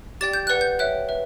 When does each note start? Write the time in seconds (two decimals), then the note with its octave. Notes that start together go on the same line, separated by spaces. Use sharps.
0.21 G4 D5 G5 A6
0.33 G6
0.47 B4 D5 F#5 F#6
0.61 G6
0.79 C#5 E5 G5 F#6
1.09 B4 E5